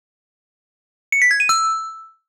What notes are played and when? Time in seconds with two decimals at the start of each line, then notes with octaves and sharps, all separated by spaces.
1.12 C#7
1.22 B6
1.31 G#6
1.40 D#7
1.49 E6